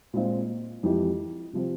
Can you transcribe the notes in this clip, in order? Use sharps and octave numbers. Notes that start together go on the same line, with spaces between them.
A#2 G#3 C4 F4
F2 E3 G#3 E4 G4
C3 F3 C4